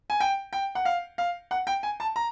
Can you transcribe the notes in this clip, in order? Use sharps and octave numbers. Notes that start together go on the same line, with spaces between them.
G#5
G5
G5
F#5
F5
F5
F#5
G5
G#5
A5
A#5